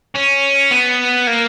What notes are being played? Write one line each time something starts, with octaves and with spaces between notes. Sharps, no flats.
C#4
B3
A#3